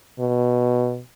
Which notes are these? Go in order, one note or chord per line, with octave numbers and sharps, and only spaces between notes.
B2